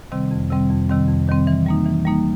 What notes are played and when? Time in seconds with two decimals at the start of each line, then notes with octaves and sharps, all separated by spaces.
0.12 C3 D#3 G3 C4
0.31 F2
0.50 C3 D#3 G3 C4
0.70 F2
0.89 C3 D#3 G3 C4
1.08 F2
1.28 C3 D#3 G3 C4
1.47 E3
1.66 G3 A#3 D#4
1.86 E3
2.05 G3 A#3 D#4